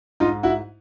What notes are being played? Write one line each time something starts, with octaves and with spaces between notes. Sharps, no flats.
G#2 D#4 F4
E4 F#4